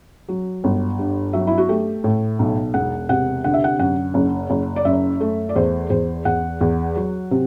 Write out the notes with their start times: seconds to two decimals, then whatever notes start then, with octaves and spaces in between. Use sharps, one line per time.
0.29 F#3
0.64 G1
0.99 G2
1.33 F#3 E5
1.47 E4
1.58 F#4
1.69 A3 G4
2.04 A2
2.39 B1
2.74 E1 F#5
3.09 C3 F#5
3.44 D3 F#5
3.54 E5
3.64 F#5
3.79 F#2 F#5
4.14 F#1
4.50 F#1
4.76 D5
4.85 F#2 E5
5.20 A3
5.49 D5
5.56 E2 C5
5.90 E2 C5
6.25 E2 F#5
6.61 E2
6.96 F#3
7.31 C3